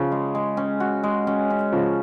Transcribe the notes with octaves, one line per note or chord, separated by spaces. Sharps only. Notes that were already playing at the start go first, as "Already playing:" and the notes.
Already playing: C#3 F3
G#3
G#3
C#4
F#4
G#3
C#4
C#4
C#3 F3 F#4